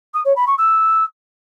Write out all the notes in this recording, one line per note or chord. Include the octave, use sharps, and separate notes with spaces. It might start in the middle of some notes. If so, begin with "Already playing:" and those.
D#6
C#5
B5
C#6
E6